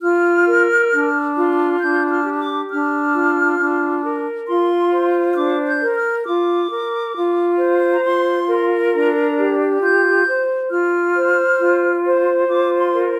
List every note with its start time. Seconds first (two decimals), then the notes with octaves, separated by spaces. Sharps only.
0.02 F4 F6
0.46 A#4
0.91 D4
1.35 F4
1.80 D4 G6
2.10 F6
2.24 G4
2.40 D6
2.69 D4 F6
3.13 F4
3.58 D4
4.03 A#4
4.47 F4 C6
4.92 C5
5.32 F6
5.36 D4 D6
5.67 G6
5.81 A#4
5.95 F6
6.25 F4 D6
6.70 A#4
7.14 F4
7.58 C5
7.91 A#5
8.03 F4 C6
8.48 A#4
8.93 D4 A#5
9.37 G4
9.81 F4 G6
10.26 C5
10.70 F4 F6
11.15 C5
11.60 F4
12.04 C5
12.49 F4 D6
12.78 C6
12.93 A#4